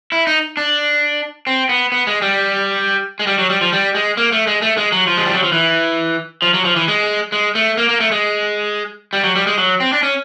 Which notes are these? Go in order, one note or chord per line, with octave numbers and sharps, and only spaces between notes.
E4
D#4
D4
C4
B3
B3
G#3
G3
G#3
G3
F#3
G3
F3
G3
G#3
A#3
A3
G#3
A3
G#3
F#3
F3
G#3
G3
F#3
F3
E3
F3
F#3
F3
E3
G#3
G#3
A3
A#3
A#3
A3
G#3
G3
F#3
G3
G#3
F#3
C4
D4
C#4